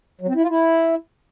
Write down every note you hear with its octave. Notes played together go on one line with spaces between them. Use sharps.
F#3
C4
E4
F4
E4